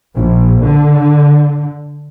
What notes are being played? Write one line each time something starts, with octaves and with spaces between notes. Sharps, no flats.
A#1
D3